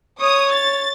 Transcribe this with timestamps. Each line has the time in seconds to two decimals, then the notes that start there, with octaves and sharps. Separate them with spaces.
0.20 C#5 D#6
0.52 A6